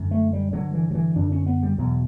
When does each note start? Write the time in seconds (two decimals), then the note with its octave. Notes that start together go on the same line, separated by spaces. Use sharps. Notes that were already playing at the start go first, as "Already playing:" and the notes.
Already playing: F#2 D3
0.11 A3
0.33 G3
0.53 G2 D3 F#3
0.74 E3
0.91 F#3
0.95 E3
1.16 F#2 D3 D4
1.32 C#4
1.46 B3
1.63 G3
1.78 E2 B2 F#3